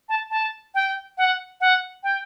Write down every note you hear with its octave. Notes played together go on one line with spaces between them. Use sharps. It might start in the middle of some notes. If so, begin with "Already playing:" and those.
A5
A5
G5
F#5
F#5
G5